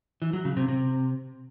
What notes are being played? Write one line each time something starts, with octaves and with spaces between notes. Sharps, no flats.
E3
F#3
C#3
C3
C3